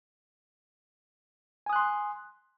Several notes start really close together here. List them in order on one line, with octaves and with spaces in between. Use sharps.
G#5 D#6 F#6 C6